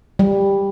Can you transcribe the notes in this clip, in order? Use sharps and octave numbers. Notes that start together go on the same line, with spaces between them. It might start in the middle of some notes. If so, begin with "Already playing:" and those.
G3